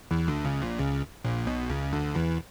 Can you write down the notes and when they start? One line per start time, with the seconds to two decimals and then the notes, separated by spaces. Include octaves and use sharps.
0.11 E2 E3
0.28 D2 D3
0.45 C#2 C#3
0.62 A#1 A#2
0.79 C#2 C#3
1.24 A#1 A#2
1.47 B1 B2
1.70 C#2 C#3
1.93 D2 D3
2.15 E2 E3